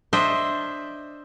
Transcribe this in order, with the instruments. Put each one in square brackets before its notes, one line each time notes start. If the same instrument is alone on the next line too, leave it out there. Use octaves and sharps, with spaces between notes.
[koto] D4 C5 D#5 E5